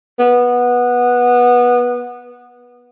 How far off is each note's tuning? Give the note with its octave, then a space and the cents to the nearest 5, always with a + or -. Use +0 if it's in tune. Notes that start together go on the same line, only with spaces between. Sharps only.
B3 -15